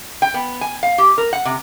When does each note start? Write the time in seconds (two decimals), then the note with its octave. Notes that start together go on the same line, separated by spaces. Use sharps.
0.22 G5
0.34 B3
0.61 G#5
0.83 F5
0.98 G4
1.18 A#4
1.33 F#5
1.45 C3